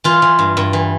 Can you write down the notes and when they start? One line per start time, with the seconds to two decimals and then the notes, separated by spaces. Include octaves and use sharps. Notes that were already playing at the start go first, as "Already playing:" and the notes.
0.04 E3 F4
0.22 E3
0.39 G2
0.57 G2
0.73 E3